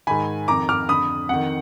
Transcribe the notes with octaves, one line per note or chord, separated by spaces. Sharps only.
G#2 D#3 G#5 B5
F2 D#3 A#5 D6
D6 F6
F2 D3 B5 D#6
F2 D#3 F#5